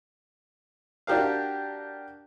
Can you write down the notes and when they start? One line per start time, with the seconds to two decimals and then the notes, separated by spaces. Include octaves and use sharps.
1.07 D4 F#4 G4 A#4 F5